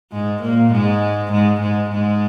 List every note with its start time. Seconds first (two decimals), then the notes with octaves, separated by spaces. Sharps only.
0.12 G#2 G#3
0.41 A#2 A#3
0.71 G#2 G#3
1.31 G#2 G#3
1.60 G#2 G#3
1.90 G#2 G#3